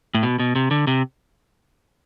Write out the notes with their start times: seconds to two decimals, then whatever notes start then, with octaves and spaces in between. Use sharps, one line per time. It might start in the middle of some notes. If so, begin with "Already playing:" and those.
0.15 A2
0.23 B2
0.39 B2
0.55 C3
0.71 D3
0.87 C3